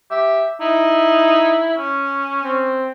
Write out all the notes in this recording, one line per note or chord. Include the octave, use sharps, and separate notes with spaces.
G4 E5
D#4 E4
C#4
C4